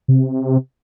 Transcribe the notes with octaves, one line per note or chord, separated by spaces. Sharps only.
C3